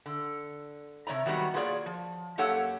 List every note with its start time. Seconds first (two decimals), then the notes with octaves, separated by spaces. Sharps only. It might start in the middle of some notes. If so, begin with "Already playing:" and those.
0.06 D3
1.07 C3 A#3 C#5 D5 A#5
1.26 D#3 F#3 G3 B3 F#4
1.54 A#3 F4 G#4 B4 C#5 D5
1.86 F3
2.38 F#2 A#3 G4 A4 C#5 F#5